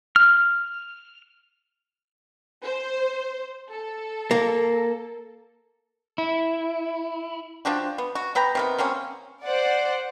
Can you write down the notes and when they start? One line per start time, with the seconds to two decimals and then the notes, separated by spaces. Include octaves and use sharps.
0.16 F6
2.63 C5
3.69 A4
4.31 A#3
6.18 E4
7.65 F3 D4 F#4 G4
7.98 B3
8.15 F#4
8.35 B3 B4 G5 A#5
8.55 C3 D#3 B3
8.78 F#3 A#3 C4 C#4
9.43 C5 D5 F#5